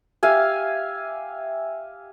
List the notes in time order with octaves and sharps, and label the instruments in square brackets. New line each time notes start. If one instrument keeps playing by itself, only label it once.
[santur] G4 E5 F5 G#5